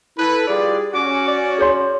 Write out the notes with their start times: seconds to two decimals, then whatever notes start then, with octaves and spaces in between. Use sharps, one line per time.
0.18 E4 A4 B4
0.48 G3 F4 G#4 D5
0.94 C#4 F#4 D6
1.28 D5
1.59 G#4 C#5 C6